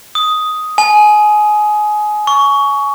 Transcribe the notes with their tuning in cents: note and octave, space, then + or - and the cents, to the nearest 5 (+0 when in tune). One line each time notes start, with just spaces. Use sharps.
D#6 +5
G#5 +25
C#6 +15